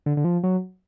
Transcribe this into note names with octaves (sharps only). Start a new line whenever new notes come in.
D3
D3
F3
F#3